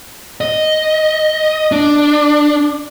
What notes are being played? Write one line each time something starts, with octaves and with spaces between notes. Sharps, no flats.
D#5
D4